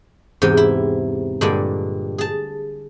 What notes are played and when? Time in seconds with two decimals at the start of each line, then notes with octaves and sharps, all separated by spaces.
0.42 E2 G#2 C3 G5
0.57 E4
1.41 G2 A#2 D3 G#3 D5
2.18 G#4 A5